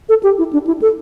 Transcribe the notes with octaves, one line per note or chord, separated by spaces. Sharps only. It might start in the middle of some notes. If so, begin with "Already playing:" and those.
A4
G4
E4
D4
E4
A4